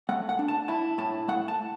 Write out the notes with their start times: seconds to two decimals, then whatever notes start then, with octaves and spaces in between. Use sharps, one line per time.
0.09 A3 F#5
0.29 F#5
0.39 D4
0.48 A5
0.68 E4 A5
0.98 A2 A5
1.28 A3 F#5
1.48 A5